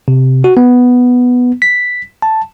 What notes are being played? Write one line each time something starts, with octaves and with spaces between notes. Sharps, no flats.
C3
F#4
B3
B6
A5